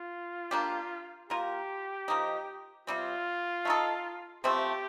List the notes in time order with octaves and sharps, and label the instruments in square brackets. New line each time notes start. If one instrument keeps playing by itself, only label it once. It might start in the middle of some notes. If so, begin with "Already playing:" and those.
Already playing: [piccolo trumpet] F4
[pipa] A#3 D4 G4
[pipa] A#3 F4 A#4 [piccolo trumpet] G4
[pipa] F3 A#3 D#4
[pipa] C3 G3 C4 [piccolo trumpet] F4
[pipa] A3 D#4 A4
[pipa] C3 F3 A3 C4 [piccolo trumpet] G4